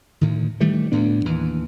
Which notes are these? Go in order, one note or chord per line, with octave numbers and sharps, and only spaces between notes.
D2 A2 D#3
D#3 E3 G3 A3
D2 A2 B3 D4
D#2 E3